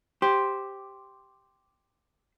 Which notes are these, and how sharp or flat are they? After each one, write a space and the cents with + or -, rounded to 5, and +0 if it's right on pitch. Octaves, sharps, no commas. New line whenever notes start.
G4 +0 C5 +0